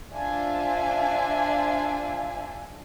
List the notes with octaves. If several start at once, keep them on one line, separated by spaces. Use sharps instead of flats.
D4 F4 C5 E5 G#5